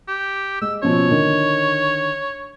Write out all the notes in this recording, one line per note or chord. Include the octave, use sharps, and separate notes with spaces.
G4
G#3 E6
B2 F3 C#4 C#5
D3 D#3